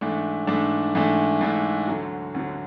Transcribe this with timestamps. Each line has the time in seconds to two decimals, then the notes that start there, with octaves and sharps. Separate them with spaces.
0.01 G#2 E3 A3 D4
0.47 G#2 E3 A3 D4
0.95 G#2 E3 A3 D4
1.41 G#2 E3 A3 D4
1.87 D2 D3 F#3
2.34 D2 D3 F#3